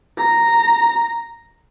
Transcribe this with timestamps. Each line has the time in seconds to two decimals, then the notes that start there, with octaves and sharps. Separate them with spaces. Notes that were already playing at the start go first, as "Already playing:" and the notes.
0.17 A#5